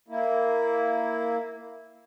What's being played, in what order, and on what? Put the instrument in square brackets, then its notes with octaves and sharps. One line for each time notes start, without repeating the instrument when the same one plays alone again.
[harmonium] A#3 E4